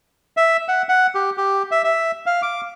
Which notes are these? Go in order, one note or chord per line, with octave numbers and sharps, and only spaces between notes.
E5
F#5
F#5
G4
G4
E5
E5
F5
D6